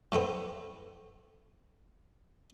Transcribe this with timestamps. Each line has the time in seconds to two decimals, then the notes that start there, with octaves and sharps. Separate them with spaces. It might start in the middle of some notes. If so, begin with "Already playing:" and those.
0.12 A2 A3 B3 C4